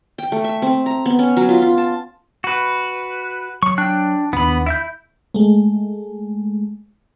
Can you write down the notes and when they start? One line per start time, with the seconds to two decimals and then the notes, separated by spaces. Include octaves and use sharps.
0.18 G5
0.32 A3
0.44 E5
0.62 C4
0.86 A#5
1.06 B3
1.19 C#4
1.37 F#3
1.49 F4
1.62 F4
1.78 A5
2.44 F#4 B4
3.63 F#3 C#6
3.78 D4 G5 F#6
4.33 D#2 E3 B3 D4 B5
4.66 E4 E5 G6
5.34 G#3 A3